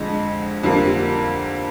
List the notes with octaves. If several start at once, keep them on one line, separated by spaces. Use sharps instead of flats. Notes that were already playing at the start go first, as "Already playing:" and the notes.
Already playing: F2 D3 G#3
F2 D3 G3 A#3